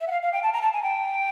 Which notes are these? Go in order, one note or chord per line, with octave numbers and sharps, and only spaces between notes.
E5
F#5
F5
F5
G5
A5
A#5
A5
G#5
G5